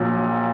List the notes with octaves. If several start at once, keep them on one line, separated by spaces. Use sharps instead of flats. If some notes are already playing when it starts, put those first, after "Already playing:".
Already playing: A#1 A#2 F#3